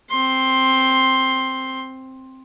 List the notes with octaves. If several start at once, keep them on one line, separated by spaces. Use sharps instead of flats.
C4 C6